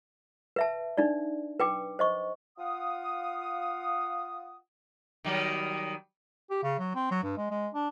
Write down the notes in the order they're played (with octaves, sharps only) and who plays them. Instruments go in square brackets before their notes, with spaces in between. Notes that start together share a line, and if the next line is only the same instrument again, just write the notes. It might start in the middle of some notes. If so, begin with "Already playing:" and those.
[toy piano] B4 E5 A5
D4 D#4 D5
B4 G5 D6
C5 D#5 C#6
[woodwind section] F4 F5 F#5 D#6
[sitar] D#3 F#3 G3
[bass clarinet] G4
C#3
F#3
C4
F#3
G2
G#3
G#3
D4